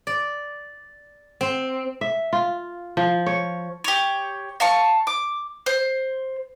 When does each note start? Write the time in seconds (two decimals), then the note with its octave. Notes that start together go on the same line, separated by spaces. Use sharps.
0.07 D5
1.41 C4
2.01 E5
2.33 F4
2.97 F3
3.26 C#5
3.84 G4 C#5
4.60 F5 A5 C#6
5.07 D6
5.66 C5